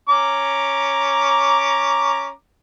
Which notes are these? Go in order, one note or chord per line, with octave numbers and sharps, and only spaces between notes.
C#4 A#5 D6